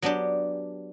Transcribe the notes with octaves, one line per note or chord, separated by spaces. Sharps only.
F#3 B3 D4 G4